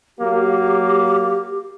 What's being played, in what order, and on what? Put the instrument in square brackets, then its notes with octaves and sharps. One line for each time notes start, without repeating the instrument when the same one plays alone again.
[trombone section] F#3 A#3 [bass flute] G4